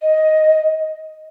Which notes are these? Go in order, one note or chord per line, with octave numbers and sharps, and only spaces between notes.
D#5